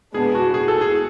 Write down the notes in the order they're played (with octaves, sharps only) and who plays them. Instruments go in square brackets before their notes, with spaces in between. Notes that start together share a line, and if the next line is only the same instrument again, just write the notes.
[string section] B2 G#3 B3 D4 [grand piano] G#4
[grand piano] F#4
G#4
A4
G#4